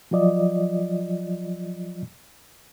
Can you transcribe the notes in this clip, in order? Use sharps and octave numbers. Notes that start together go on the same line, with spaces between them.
F3 F#3 F4 D5 D#5